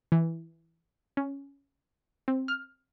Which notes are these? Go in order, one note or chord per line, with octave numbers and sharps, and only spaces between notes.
E3
C#4
C4
F6